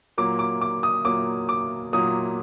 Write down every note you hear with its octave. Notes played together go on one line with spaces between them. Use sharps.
A#2 F#3 A#3 D6
D6
D6
D#6
A#2 F#3 A#3 D6
D6
A#2 F#3 A#3 D#6